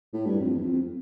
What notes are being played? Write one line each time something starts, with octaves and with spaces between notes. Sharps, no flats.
A2
G2
F2
E2
F2
F2